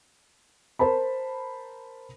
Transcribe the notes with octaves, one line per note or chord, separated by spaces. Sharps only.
A#4 C5 A5 B5